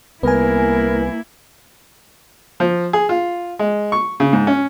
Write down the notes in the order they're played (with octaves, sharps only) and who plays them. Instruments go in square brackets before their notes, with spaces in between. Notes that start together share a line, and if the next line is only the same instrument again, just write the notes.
[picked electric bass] C2 B3 [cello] A#3 E4 [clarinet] A#4 [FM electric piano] B4 G#5
[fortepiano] F3
G#4
F4
G#3
C#6
C#3
G#2
C#4